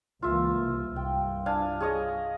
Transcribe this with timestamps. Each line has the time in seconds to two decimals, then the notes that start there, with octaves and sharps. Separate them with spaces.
0.22 C#2 E3 A#3 F4 E5
0.62 C2
0.96 C2 G2 G5
1.46 D4 F5 G#5
1.80 G#4 C#5 D#5